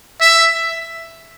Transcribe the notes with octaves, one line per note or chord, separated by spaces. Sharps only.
E5